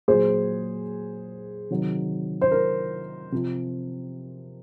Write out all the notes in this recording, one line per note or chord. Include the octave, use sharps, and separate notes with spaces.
A#2 F#3 G#4 C5
C3 D#3 F#3
C5
A#4
C3 F3